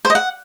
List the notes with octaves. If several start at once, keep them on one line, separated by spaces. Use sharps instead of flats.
C5
D#5
F#5